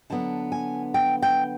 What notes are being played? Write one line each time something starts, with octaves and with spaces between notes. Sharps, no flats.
D3 F#3 B3 A5
G#5
G5
G5